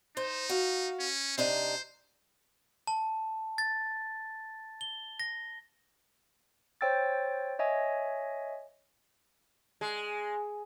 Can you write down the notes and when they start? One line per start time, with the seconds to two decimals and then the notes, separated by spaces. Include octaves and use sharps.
0.17 D#4 C5
0.49 F#4 F5
1.00 C#4
1.38 C3 D4 D#4 C5
2.87 A5
3.58 A6
4.81 G7
5.20 A#6
6.81 C5 C#5 G5 E6 A6
7.59 C#5 D#5 E5 G#5
9.81 G#3